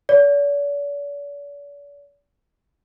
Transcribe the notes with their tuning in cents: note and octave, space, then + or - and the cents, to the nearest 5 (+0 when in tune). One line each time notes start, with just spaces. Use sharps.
D5 -45